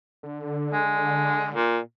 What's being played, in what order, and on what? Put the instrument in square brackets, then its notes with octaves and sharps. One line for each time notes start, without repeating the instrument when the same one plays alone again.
[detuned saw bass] D3
[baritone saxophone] G#3
A#2